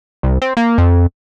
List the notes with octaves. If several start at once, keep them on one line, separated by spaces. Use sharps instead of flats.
C2
C4
A#3
F2